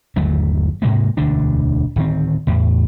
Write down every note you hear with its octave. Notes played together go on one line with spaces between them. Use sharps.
G1 D#2 F#3 A3
G#2 C3 G#3 A#3
E1 D2 D3 D4
D1 D#3 C4
E2 A2